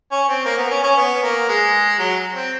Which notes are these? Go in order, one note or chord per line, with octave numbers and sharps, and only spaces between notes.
C#4
C4
A#3
B3
C#4
C#4
B3
A#3
G#3
F#3
C4